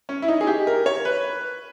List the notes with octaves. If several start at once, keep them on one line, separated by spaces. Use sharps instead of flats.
C#4
E4
D#4
G#4
G4
A#4
C#5
B4